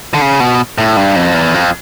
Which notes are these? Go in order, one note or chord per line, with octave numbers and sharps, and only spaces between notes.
D3
C#3
B2
A2
G2
F2
E2
F2